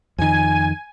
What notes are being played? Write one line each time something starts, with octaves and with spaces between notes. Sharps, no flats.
F2 D#3 G#5